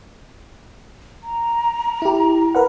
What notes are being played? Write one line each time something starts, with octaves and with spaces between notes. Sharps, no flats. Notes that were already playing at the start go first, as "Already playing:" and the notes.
A#5
E4 G4
A#4 B4 F#5